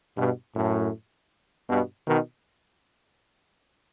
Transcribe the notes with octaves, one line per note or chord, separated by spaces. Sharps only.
G2 B2
F#2 A2
G2 B2
B2 D#3